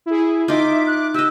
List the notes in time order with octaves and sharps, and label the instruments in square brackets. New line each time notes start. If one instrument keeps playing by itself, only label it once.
[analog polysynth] E4 G#4
[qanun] D#4 F4 [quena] E5 [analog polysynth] D6
[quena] F#6
[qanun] G4 D#5 [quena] E6